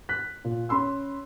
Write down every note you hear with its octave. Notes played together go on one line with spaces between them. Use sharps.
F#6 B6
A#2
C#4 B5 C6 E6